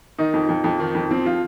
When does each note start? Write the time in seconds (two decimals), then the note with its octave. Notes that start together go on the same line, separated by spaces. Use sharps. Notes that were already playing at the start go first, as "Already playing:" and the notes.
0.18 D#3 D#4
0.34 F2
0.49 F2
0.64 F2
0.80 D#3
0.95 F2
1.11 F3 C4
1.26 F3 F4